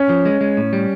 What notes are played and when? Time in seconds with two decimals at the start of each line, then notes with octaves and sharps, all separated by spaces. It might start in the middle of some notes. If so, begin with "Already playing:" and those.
Already playing: C#4
0.09 F3
0.25 G#3
0.41 G#3
0.57 A2
0.73 G3